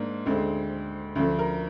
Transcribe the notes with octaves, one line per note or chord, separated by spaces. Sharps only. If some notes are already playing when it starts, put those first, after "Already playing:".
Already playing: G#2 A#3 D4
D2 D3 G#3 C4
D2 D3 F3
A#4